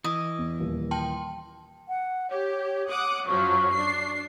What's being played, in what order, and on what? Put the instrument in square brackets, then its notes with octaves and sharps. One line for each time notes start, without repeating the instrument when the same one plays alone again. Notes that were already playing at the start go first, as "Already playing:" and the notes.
[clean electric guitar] E3 [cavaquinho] D#5
[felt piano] E2
D#1 D#2
[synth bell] G5 A5 C6
[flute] F#5
[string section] G4 [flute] C#5
[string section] F#5 D6 D#6
[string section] F#2 F3 F#3 [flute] C#6
[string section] D4 C7